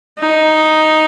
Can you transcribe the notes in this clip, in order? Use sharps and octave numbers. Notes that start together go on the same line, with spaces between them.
D#4